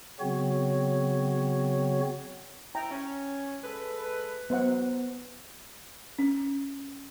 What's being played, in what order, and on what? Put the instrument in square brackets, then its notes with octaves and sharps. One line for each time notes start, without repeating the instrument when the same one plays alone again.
[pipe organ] C#3 F#3 B3 C4 F#4 C#5
[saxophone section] E4 [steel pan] G5 A#5
[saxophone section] C#4
G#3 A4 B4
[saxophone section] F#3 [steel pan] B3 C5 F#5
[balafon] C#4